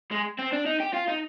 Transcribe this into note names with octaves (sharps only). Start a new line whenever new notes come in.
G#3
C4
D4
D#4
G4
F4
D#4